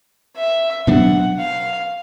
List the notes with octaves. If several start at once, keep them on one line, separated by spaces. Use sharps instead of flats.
E5
B2 F#3 B3 D4 F#5
F5